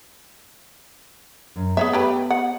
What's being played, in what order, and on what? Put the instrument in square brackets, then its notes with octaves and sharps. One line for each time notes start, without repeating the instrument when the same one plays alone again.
[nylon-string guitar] F#2
[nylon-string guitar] B3 [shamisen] G#4 C#5 E5
[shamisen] A3 G4 B4
F#5